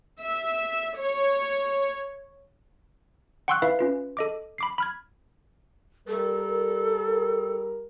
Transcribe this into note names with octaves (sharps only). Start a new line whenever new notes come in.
E5
C#5
F#5 G5 C6 C#6 E6 F#6
E4 B4 E5 F5
C#4 F4 B4
A4 D#5 D6
B5 D6 C7
B5 F6 G#6
G3 A4 A#4